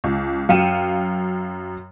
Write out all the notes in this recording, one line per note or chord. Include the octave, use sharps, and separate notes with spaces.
C#2
F#2 F5 G5 C#7 D#7 E7